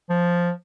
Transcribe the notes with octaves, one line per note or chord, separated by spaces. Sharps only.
F3